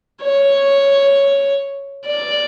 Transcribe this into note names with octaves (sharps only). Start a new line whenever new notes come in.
C#5
D5